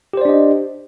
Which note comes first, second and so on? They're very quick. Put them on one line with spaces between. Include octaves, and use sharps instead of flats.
G4 C5 D5 D4 D#5